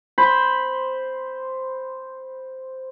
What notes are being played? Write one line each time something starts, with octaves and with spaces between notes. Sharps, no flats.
C5 B5